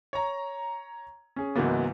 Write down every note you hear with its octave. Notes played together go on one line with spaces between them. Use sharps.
C#5 A#5
C#4 G#4
C#2 G#2 E3 F#3 A#3 B3